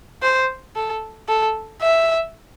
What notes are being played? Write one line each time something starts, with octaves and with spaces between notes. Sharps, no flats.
C5
A4
A4
E5